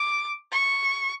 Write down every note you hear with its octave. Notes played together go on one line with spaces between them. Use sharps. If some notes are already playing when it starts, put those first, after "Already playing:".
Already playing: D6
C#6